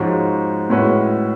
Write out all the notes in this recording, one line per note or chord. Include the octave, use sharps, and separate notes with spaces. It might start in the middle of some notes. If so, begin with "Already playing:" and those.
Already playing: G#2 F3 G#3 C#4 F#4
A2 G#3 C#4 F#4 B4